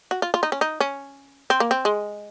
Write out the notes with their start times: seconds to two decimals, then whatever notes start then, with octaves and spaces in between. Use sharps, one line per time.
0.11 F#4
0.22 F4
0.34 F4
0.43 D#4
0.52 C#4
0.61 D#4
0.80 C#4
1.50 C4
1.60 A#3
1.71 C4
1.85 G#3